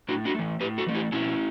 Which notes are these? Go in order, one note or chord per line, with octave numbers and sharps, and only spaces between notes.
A2 D4 F#4
D4 F#4
E3 A3
A2 G4 B4
F#4 A4
E3 A3
E4 G4
B2 C#4 E4